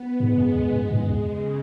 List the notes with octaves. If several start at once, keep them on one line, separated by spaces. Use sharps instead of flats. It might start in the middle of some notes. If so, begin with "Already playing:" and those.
Already playing: B3
G#2 G#3
F#2
E2
F#2
G#2
F#2
E2
C#3